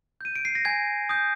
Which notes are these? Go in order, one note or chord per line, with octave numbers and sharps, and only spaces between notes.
G6 D#7
D7
C7
A#6
G#5 G#6
D#6 G6